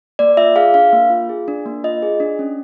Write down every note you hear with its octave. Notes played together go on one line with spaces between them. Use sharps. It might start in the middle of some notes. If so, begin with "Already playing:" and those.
A#3 D5
F4 E5
G#4 F5
D4 F5
A#3
F4
G#4
D4
A#3
F4 D#5
G#4
D4
C#4